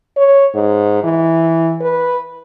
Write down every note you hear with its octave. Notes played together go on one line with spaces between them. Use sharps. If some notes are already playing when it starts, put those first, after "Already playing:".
C#5
G#2
E3
B4